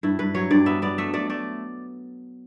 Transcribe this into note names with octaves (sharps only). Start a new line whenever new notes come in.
G2 E4
G2 B4
F#3 C#5
G2 D5
B3 E5
B3 D5
A3 E5
A3 D5
A3 D5